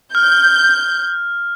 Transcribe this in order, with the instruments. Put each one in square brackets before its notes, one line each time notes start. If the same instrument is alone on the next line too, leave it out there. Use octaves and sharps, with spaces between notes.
[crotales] F6 [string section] G6